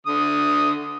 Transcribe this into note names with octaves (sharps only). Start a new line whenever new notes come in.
D3 D#6